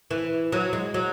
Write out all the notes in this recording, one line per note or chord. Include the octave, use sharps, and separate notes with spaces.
E3
F#3
G#3
F#3